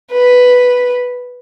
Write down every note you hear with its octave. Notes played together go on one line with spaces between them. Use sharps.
B4